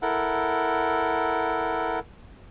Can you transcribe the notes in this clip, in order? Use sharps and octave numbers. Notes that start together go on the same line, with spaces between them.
E4 A4 A#4 F#5